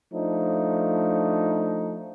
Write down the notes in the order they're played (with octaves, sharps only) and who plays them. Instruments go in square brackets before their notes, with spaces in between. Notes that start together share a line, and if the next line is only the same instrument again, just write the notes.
[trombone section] F3 A3 D4 D#4